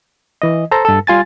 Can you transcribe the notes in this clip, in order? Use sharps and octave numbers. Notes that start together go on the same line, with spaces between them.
E3 D#5
A4 C5 A#5
G2 A4
G3 F4 G#5 A6